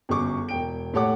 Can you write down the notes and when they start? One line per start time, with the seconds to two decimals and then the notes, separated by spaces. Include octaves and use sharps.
0.09 G1 F#2 G#4 C#6 D6
0.49 E1 G5 D7
0.94 A2 G4 A4 C#5 F#5 D6